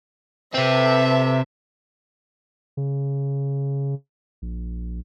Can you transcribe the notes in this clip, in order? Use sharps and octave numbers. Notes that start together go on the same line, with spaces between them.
C3 C4 A4 B4 E5
C#3
A#1